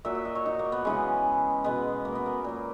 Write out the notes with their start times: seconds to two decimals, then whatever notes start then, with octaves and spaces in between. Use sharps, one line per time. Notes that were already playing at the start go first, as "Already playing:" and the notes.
0.05 A#2 F#3 E5
0.15 E5
0.25 D#5
0.35 C#5
0.46 D#4
0.59 A#3
0.72 B3
0.85 C#3 E3 G#3 C#4
1.64 B2 G#3 B3
2.05 A#3
2.15 B3
2.26 A#3
2.44 A#2 F#3